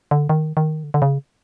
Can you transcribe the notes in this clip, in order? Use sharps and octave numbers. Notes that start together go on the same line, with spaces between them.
D3
D#3
D#3
D3
D3
C#3